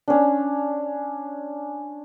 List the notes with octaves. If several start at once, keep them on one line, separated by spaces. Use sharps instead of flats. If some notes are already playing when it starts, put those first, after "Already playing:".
C#4 D4